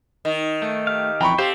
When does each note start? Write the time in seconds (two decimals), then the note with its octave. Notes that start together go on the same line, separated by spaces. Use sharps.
0.25 D#3
0.62 A3
0.87 G4 F5
1.21 F2 E3 G5 A#5 B5 C#6
1.38 C4 G4 A4 C5 F5